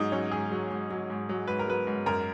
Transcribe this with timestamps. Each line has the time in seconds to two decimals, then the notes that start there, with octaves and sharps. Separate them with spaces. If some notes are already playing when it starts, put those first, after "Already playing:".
Already playing: G#2 F#3 D#4
0.12 F#3 C#4
0.31 G#2 G#4
0.52 F#3
0.70 G#2
0.90 F#3
1.10 G#2
1.29 F#3
1.48 G#2 B4
1.59 A#4
1.68 F#3 B4
1.87 G#2
2.06 F#2 A#4